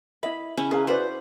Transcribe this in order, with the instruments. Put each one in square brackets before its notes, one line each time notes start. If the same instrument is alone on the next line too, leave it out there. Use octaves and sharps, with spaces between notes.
[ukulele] E4 D#5 E5 [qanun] B5
[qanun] C#3 C#4 E4
[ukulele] G#4 F5 A#5 [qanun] B4
[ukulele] F#4 B4 D5 [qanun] C5 F#5